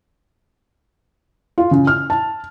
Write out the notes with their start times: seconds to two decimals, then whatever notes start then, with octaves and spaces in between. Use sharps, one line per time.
1.58 F4
1.71 C#3
1.87 F6
2.10 A5